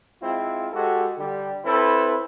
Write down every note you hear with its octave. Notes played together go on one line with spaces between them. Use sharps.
G#3 C4 E4 F4
G#3 F#4 G4 A4
D3 G3 G4
C4 E4 A4 B4